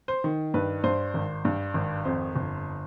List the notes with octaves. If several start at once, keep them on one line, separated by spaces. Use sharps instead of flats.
C5
D#3
G2 B4
G2 C5
G#1
G2
G#1
F2 C5
G1